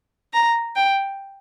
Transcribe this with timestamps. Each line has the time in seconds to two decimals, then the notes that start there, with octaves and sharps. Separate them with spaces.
0.33 A#5
0.76 G5